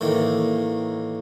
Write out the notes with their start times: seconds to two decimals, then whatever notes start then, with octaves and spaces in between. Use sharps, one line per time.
0.01 A2 D#3 E3 A#3